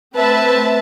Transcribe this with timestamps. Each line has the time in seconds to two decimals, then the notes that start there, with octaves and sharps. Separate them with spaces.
0.16 A3 C4 B4 E5 A5